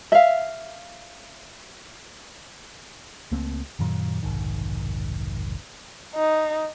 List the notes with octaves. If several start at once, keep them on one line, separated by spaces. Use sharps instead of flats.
E5 F5
C#2 A3 A#3 C4
F#2 A#2 D#3 F#3
F1 B1 G#2 D#3
D#4